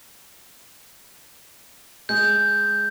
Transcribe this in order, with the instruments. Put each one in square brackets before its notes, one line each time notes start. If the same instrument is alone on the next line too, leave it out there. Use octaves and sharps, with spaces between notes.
[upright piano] G#3 [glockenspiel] G6